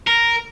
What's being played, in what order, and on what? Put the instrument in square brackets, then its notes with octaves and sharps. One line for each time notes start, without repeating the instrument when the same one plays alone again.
[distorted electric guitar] A#4